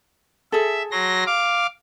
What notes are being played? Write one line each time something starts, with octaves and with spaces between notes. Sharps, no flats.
G#4 A4 E5
F#3 C6 A#6
F5 D6